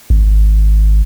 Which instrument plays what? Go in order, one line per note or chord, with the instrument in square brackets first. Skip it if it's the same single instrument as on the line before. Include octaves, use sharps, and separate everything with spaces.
[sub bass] G#1